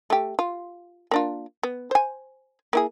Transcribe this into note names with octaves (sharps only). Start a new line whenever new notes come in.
A3 G4
F4
A#3 D4 F4
B3
C5 G#5
A#3 E4 G#4